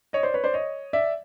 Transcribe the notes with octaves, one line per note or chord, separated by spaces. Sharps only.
C#5 D#5
C5 D5
B4 C#5
C5 D5
C#5 D#5
D5 E5